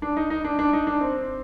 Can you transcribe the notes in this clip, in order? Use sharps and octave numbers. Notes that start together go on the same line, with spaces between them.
D4
D#4
D#4
D4
D4
D#4
D4
C4